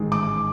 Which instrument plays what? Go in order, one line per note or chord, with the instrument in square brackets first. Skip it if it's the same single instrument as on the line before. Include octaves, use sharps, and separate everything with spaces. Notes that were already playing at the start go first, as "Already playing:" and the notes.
Already playing: [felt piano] A1 G#2 D#3 G#3
D6